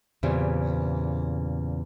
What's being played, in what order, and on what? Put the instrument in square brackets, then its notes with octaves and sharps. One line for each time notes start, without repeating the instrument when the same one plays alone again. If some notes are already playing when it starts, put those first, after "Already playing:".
[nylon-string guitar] E2 A#2 C#3 G3 C4